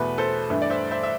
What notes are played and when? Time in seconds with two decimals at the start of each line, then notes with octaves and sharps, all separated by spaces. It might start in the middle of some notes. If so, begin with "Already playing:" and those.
Already playing: E2 B2 A3 B4
0.18 A4 C5
0.50 G2 E3 A3
0.62 D5
0.70 C5 E5
0.91 C5 E5
1.03 E5